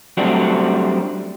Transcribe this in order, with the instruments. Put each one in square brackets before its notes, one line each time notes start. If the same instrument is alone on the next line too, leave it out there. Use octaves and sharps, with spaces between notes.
[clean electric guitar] F#3 G3 A3 C4 D4 F#4